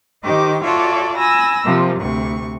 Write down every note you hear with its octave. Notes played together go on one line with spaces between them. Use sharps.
D#3 G4 C5 D#5 D6
F4 F#4 A4 C#5 D5 E5
G#5 B5 E6 A#6
C3 F3 A#3
D2 C3 C#6